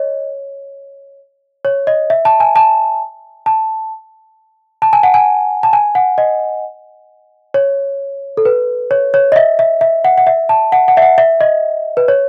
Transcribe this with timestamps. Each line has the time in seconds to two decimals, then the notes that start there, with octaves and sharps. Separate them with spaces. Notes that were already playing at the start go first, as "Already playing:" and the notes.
Already playing: C#5 D#5
1.65 C#5
1.87 D#5
2.10 E5
2.25 A5
2.40 G#5
2.56 A5
3.46 A5
4.82 A5
4.93 G#5
5.03 F#5
5.14 G#5
5.63 A5
5.73 G#5
5.95 F#5
6.18 D#5
7.54 C#5
8.37 A4
8.45 B4
8.91 C#5
9.14 C#5
9.32 D#5
9.36 E5
9.59 E5
9.81 E5
10.05 F#5
10.18 F#5
10.27 E5
10.49 A5
10.72 F#5
10.88 F#5
10.97 E5
11.02 F#5
11.18 E5
11.41 D#5
11.97 B4
12.08 C#5